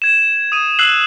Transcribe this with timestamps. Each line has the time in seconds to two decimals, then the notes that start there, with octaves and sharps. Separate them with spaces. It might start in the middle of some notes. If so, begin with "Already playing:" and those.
0.02 G#6 E7
0.52 D#6 D#7
0.79 E6 F#6 C7 F#7